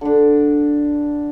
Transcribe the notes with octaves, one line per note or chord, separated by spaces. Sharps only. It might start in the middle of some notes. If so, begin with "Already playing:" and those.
D3 D4